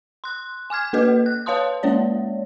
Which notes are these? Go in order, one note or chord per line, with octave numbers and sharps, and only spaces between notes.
C6 F#6
G#5 D6 F6 G#6
A#3 F#4 A4 B4 D#5
F#6
B4 C#5 F5 A5 C6 D#6
G#3 A#3 C#4 C#5 D5